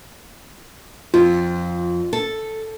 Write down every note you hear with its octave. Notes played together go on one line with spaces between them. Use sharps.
F2 F4
A4